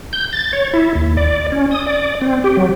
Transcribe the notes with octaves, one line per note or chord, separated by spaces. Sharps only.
G6
A6
C#5
E4
D#2
D5
C#4
D#6
D5
C4
G4
F#3